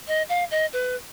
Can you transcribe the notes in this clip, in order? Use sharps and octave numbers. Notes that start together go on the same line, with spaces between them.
D#5
F5
D#5
B4